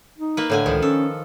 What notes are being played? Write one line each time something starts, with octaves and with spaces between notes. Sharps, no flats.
D#4
A#3 B4
A2 D3 G#5
C#2 D#3 F3
C#4 A4